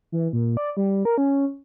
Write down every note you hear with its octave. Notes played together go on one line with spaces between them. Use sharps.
E3
A#2
D5
G3
A#4
C#4